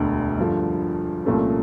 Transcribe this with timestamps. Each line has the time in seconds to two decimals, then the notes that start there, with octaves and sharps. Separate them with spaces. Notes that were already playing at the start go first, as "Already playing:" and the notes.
Already playing: E1 D2 D3
0.38 G2 D3 F3 A3
1.25 C2 A#2 F3 A3 C#4